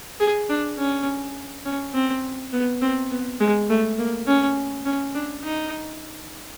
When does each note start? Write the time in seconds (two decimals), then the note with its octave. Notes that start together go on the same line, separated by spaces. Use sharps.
0.20 G#4
0.50 D4
0.78 C#4
1.65 C#4
1.94 C4
2.53 B3
2.82 C4
3.12 B3
3.41 G#3
3.70 A3
3.99 A#3
4.27 C#4
4.86 C#4
5.15 D4
5.44 D#4